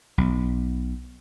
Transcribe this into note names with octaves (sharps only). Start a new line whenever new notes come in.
B1